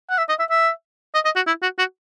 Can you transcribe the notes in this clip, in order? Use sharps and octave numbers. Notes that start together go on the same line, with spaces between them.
F#5
E5
D#5
E5
E5
D#5
D#5
F#4
E4
F#4
F#4